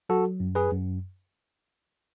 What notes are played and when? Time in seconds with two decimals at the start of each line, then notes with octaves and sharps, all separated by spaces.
0.09 F#3 F#4 A4
0.40 F#2
0.55 G#4 B4
0.71 F#2